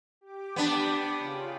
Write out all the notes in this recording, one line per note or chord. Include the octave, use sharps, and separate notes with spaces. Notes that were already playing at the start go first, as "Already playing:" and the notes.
G4 D6
B3 D4
C#3 F4